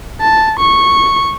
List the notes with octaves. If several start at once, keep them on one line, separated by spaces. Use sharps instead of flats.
A5
C#6